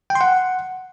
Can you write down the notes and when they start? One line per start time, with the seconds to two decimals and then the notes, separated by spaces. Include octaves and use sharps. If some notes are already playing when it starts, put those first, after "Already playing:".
0.10 G5
0.15 C6
0.21 F#5